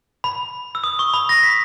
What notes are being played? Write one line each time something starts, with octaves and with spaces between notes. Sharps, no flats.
B5
E6
D#6
C#6
B5
A#6
B6